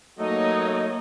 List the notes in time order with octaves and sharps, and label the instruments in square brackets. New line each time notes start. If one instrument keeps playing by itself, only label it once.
[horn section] F#3 A3 D#4 [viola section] A#3 C#5 D#5